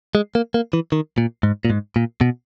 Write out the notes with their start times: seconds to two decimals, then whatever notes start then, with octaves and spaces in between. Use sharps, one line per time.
0.15 G#3
0.35 A#3
0.54 A#3
0.73 E3
0.92 D#3
1.18 A#2
1.43 G#2
1.65 A#2
1.70 G#2
1.96 A#2
2.21 B2